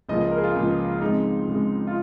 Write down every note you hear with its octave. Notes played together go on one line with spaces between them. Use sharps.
C#2 C#3 F3 A#3 D#5
D#5
A#4
G#4
F4
C#2 C#3 F3 A#3
F2 C#3 G#3 D#4
F2 C#3 G#3
F4